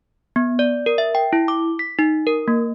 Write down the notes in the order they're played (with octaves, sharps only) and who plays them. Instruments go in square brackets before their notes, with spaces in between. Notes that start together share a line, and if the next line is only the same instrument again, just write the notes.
[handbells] B3
D5
A#4
E5
G5
E4
D6
B6
D#4
A#4
A#3